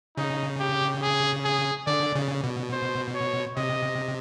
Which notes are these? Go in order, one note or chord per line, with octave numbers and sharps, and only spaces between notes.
C#3 D#4
G4
G#4
G#4
D3 D5
C#3
B2
C5
C#5
C3 D#5